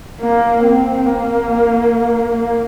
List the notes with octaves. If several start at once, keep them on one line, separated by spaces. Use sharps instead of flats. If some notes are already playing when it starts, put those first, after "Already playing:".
A#3
C4
A#3
A#3